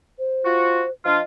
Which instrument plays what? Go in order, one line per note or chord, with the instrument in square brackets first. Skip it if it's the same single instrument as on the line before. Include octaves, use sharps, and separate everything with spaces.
[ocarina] C5
[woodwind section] F4 F#4
[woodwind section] F3 D4 F4 [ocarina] D#5